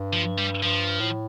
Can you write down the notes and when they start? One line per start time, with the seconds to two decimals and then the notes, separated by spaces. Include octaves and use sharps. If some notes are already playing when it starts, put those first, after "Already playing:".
Already playing: G2
0.13 F3
0.38 G3
0.63 G2 F3
1.00 A2